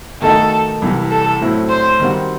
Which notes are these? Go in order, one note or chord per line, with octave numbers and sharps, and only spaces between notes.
D#3 A3 D#4 F#4 A4
C2 C3 E3
A4
A2 F#3 C4 E4 A4
C5
D#3 G3 C4 F#4